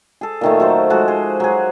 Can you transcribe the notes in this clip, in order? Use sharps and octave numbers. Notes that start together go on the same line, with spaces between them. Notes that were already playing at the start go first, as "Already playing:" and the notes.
G#4 A4
A#2 D#3 A3
F#3 A4 C5
F3 G#3 F#4 A4
G#4 C5
F#3 G#4